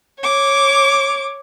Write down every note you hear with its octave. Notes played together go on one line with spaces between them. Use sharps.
C#5 D6